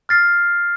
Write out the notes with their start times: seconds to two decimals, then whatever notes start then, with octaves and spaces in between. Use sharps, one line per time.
0.09 F6 A6 C7